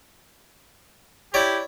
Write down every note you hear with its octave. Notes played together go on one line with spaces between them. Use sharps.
E4 G4 C#5 D5